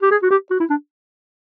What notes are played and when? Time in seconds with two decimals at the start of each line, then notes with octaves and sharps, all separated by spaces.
0.02 G4
0.11 G#4
0.22 F#4
0.30 G4
0.50 F#4
0.60 E4
0.70 D4